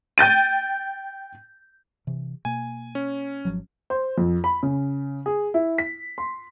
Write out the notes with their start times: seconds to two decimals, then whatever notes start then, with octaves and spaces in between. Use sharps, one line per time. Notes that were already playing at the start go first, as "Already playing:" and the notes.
0.18 G5 G6 A6 D#7
2.07 C3 E3
2.45 B2 A#3 G#5
2.95 C#4
3.45 G#1 F3 F#3
3.90 C5
4.18 F2
4.44 B5
4.63 C#3
5.26 G#4
5.54 E4
5.78 B6
6.18 C6